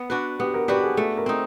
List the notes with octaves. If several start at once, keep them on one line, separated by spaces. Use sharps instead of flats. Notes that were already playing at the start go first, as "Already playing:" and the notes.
Already playing: B3
D4 F#4 B4
B3 G4
A#4
D4 F#4 G4 B4
G#4
A3 G#4
A#4
C4 D#4